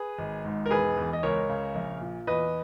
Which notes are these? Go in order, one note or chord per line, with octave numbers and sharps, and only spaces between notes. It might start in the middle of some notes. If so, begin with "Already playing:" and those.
Already playing: G#4 B4
G#1
G#2
A#4
E1 G#4 B4
E2
D#5
C#2 A#4 C#5
C#3
A#1
A#2
E2 B4 D#5